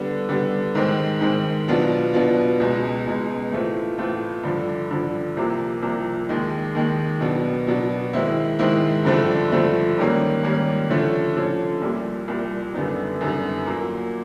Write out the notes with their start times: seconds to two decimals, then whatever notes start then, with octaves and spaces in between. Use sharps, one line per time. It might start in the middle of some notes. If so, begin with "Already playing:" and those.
Already playing: D3 G3 B3
0.29 D3 G3 B3
0.75 G#2 D#3 G#3 C4
1.21 G#2 D#3 G#3 C4
1.68 B2 F#3 B3 D4 F4
2.13 B2 F#3 B3 D4 F4
2.60 C#2 B2 G#3
3.06 C#2 B2 G#3
3.52 A2 E3 A3 C4 F4
3.98 A2 E3 A3 C4 F4
4.44 G2 D3 F3
4.91 G2 D3 F3
5.37 C2 C3 F3 A#3
5.82 C2 C3 F3 A#3
6.29 D#2 D#3 G#3
6.75 D#2 D#3 G#3
7.21 B2 F#3 B3 D4
7.67 B2 F#3 B3 D4
8.13 G#2 D#3 G#3 C4 E4
8.59 G#2 D#3 G#3 C4 E4
9.05 G2 D3 F3 A3 C4
9.51 G2 D3 F3 A3 C4
9.98 G#2 D#3 G3 A#3 C#4
10.43 G#2 D#3 G3 A#3 C#4
10.90 D3 F3 A3 C#4
11.36 D3 F3 A3 C#4
11.82 C2 A#2 G3
12.28 C2 A#2 G3
12.74 F#2 D3 G3 B3 D#4
13.21 F#2 D3 G3 B3 D#4
13.66 A#2 F#3 A#3